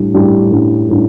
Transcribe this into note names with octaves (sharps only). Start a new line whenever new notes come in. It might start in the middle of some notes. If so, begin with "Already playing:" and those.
Already playing: A2 G3 D4
A2 G3 D4
A2 G3 D4
A2 G3 D4